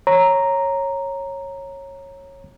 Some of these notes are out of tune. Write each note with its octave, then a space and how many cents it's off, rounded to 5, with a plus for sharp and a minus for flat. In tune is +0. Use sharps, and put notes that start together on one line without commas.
C#5 -15 A#5 +0